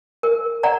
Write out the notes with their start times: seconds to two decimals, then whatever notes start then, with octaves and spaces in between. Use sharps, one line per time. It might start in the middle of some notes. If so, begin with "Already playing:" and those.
0.23 A#4
0.63 D5 F#5 A#5